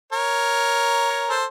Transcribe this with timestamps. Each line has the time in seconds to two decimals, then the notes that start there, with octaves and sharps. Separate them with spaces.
0.12 A#4 C#5
1.29 A4 C5